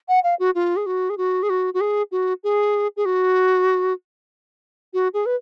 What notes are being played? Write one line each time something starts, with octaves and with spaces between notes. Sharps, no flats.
F#5
F5
F#4
F4
G#4
F#4
G#4
F#4
G#4
F#4
F#4
G#4
F#4
G#4
G#4
F#4
F#4
G#4
B4